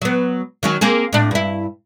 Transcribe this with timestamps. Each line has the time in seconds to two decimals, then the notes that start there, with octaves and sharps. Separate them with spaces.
0.02 F#3 B3
0.63 D#3 F#3 C#4
0.81 A#3 C4 G#4
1.13 A2 D4
1.31 G2 E4